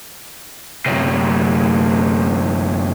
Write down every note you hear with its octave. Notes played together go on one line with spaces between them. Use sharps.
F#2 C3